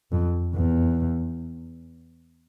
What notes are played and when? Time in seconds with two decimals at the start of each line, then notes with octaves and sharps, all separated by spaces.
0.12 F2
0.54 E2